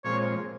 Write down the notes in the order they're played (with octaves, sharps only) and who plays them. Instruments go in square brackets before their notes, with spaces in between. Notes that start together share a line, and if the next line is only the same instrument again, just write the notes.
[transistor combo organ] A#2 F3 G#3 C4 [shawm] C#5